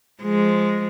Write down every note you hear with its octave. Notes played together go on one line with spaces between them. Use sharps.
F3 G#3